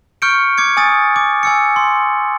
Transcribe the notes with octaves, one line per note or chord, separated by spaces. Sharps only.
C#6 F6 G6 C#7 D7
D6 G#6 C#7
G#5 D#6 A6
D6
G#5 E6 C#7
C6